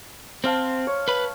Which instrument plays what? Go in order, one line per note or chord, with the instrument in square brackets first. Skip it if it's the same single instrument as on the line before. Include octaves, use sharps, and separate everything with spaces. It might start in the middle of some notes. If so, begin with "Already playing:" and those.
[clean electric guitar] C4 [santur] C5 F5 A5
[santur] C#5
[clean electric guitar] B4 B5